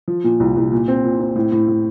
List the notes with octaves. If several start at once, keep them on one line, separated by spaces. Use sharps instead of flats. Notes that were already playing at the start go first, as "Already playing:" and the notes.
F3
A#2
C2
C2
A#2
C4
A#2
C4
A2
A2
A2